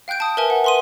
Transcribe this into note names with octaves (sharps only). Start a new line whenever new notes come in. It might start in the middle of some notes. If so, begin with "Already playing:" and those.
F5 G5 F#6 G6 D7
A5 D#6
A#4 B4 E5 G#5 A5
F#5
B4 E5 C6 D#6 D#7